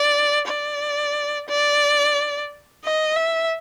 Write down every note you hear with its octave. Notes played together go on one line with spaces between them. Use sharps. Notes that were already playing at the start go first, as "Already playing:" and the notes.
Already playing: D5
D5
D5
D#5
E5